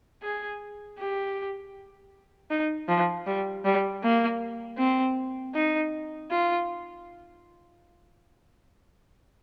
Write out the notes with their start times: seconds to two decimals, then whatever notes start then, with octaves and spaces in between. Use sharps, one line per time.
0.23 G#4
0.99 G4
2.50 D#4
2.88 F3
3.26 G3
3.65 G3
4.03 A#3
4.78 C4
5.55 D#4
6.31 F4